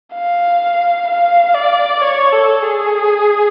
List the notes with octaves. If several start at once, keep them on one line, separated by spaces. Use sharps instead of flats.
F5
F5
D5
C#5
A4
G#4